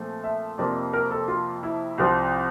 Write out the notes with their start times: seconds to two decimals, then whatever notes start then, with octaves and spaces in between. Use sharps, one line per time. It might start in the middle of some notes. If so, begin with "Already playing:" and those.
Already playing: A#2 F3 A3 C4
0.24 E5
0.58 F2 C3 F3 A#3 D5
0.93 A#4
1.11 A4
1.28 F4
1.63 E4
1.98 C2 C3 F3 C4